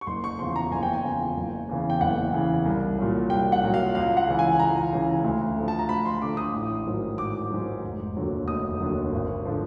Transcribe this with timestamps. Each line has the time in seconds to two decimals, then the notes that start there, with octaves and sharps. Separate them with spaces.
0.01 C#6
0.07 F#1 C6
0.24 C#6
0.39 E2 C#3 F3 C6
0.56 A#5
0.72 F#1 G#5
0.83 G5
0.93 G#5
1.04 E2 C#3 F3
1.37 F#1
1.69 E2 C#3 E3
1.90 G5
2.01 F#1 F#5
2.33 E2 C#3 E3
2.66 C2
2.98 A#2 F#3
3.30 C2 G5
3.52 F#5
3.63 A#2 F#3
3.74 F5
3.95 C#2 F5
4.17 F#5
4.27 C#3 E3
4.39 G#5
4.60 C#2 A#5
4.92 C#3 E3
5.24 D2
5.57 D3 F3
5.68 A5
5.79 A#5
5.89 D2 B5
6.05 C6
6.22 D3 F3 D6
6.37 D#6
6.54 A1
6.86 G#2 D#3 F#3
7.18 A1 D6
7.50 G#2 D#3 F#3
7.84 F1
8.16 D#2 D3 F#3
8.48 F1 D#6
8.80 D#2 D3 F#3
9.13 G#1
9.45 D3 F3